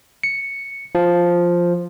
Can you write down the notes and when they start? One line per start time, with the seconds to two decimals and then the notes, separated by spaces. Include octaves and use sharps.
0.23 C#7
0.95 F3